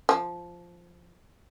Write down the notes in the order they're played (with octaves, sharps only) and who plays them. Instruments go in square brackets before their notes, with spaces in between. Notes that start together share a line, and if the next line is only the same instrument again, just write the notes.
[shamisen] F3